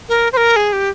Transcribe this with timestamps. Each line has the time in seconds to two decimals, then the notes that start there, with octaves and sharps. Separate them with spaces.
0.09 A#4
0.33 C5
0.37 A#4
0.56 G#4
0.73 G4